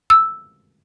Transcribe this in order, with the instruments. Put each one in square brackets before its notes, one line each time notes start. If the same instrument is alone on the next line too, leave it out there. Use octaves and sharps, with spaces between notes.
[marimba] E6